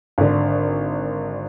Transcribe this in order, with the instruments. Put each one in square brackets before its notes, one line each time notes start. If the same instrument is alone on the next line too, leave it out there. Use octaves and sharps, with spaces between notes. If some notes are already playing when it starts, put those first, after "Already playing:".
[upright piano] G#1 D3